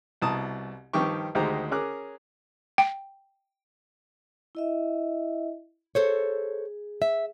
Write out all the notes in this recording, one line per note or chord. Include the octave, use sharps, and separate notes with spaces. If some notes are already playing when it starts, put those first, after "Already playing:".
C2 B2 E4 A5 A#5 D#6
G2 D#3 F3 G4 C#6
D2 D#3 G#3 G4 C5 A#5
C#4 G#4 A#4 D6 F#6
G5
E4 D#5 E5
G#4 A4 C5 C#5
E5